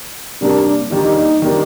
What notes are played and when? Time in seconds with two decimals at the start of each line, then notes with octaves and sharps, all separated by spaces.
0.41 C3 G3 A#3 D4
0.91 D#3 G3 A#3 D4 D#4
1.42 D#3 G3 A#3 D4